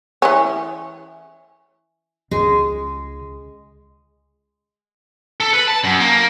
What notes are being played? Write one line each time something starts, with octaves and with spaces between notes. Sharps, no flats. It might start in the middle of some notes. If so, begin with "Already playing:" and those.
E3 C#4
C#2 G#3
A4
B4
A5
F#2
A#3
A#3